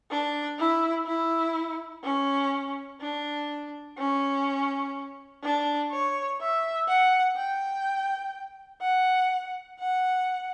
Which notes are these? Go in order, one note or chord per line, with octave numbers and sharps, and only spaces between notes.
D4
E4
E4
C#4
D4
C#4
D4
C#5
E5
F#5
G5
F#5
F#5